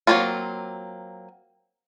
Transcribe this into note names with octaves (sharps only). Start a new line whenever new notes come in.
F#3 G3 A#3 C4 F4